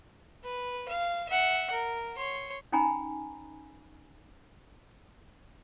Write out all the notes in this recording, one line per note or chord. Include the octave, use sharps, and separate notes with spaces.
B4
F5
E5 F#5
A#4
C#5 C6
C#4 D#4 G5 G#5 A#5 B5